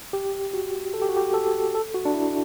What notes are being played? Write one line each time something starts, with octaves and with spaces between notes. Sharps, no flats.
G4
F#4
A4
G4
F#4
G4
A4
A4
F#4
D4
E4